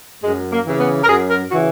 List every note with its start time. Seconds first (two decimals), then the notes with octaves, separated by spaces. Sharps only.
0.24 F#2 G#3
0.53 A#3
0.66 C#3 E3
0.80 B3
1.04 A#4
1.08 F#2 G#4
1.29 A#4
1.51 C#3 E3 F#4